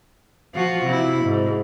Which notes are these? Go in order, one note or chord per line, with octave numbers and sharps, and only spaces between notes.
F3 F4 F#4
C3 E4
G#2